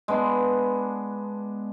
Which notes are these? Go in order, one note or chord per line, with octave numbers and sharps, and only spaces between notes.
G#3 B3 D4